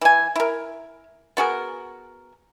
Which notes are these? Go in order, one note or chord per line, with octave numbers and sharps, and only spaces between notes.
E3 G#5
E4 A#4
B3 F#4 G#4 A#4